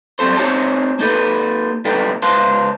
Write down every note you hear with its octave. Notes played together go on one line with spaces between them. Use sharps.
F#3 G3 C4 A4 C5
C4 D#4 C5 C#5 A5
A#3 D#4 A4 B4
C2 A#2 D#4 A4 B4 G5
C#2 B4 C5 F5 A5 C6